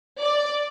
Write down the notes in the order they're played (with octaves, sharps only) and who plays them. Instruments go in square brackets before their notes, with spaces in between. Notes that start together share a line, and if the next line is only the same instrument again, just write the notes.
[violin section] D5